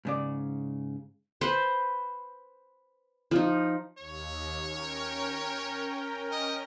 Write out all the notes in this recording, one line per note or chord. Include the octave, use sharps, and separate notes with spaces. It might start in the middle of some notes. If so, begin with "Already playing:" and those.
G#2 C#3 D5
B4 C5
F3 D#4
D#2 C#5
C#4 A#4 G5
D#5